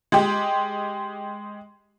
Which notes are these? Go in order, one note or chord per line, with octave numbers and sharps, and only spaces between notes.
G#3 G4